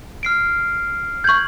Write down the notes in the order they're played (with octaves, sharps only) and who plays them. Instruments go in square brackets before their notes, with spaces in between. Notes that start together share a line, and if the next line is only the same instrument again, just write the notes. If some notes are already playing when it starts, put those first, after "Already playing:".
[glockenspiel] F6 C7 D7
[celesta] C#6 G6 [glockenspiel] G#6 F#7